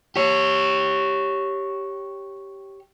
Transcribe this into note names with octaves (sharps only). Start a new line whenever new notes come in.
G4 C#5